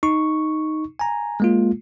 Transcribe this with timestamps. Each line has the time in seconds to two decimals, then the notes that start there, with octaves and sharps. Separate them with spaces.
0.03 D#4 C#6
0.99 G#5 A#5
1.40 G#3 A#3 F4